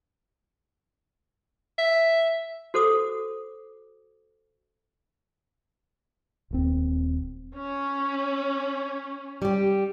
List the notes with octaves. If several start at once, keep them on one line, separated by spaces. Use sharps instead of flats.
E5
F#4 A4 C5 D6 D#6
D#1 D#2 C4
C#4
G3 G4